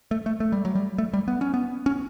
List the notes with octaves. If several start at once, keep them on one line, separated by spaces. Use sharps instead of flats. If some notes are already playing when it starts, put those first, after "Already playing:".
A3
A3
A3
G3
F#3
G3
A3
G3
B3
C#4
B3
C#4